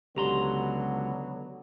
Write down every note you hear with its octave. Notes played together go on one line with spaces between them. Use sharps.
C#2 D3 F#3 B3 G4 A#5 C6